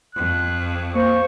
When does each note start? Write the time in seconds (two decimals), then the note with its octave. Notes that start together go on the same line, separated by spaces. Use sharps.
0.16 F2 F#6
0.95 A#3 C5 C#6